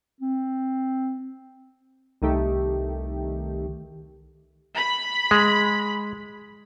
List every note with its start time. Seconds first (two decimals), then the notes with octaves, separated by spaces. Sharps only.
0.21 C4
2.22 C2 D#3 A3 G4
4.77 B5
5.31 G#3